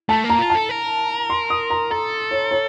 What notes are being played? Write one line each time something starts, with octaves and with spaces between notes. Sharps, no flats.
A3 A5
A#3
A#5
F4
A4 A5
A#4
C6
D#6
A#5
A4 A#5
C#5
C#5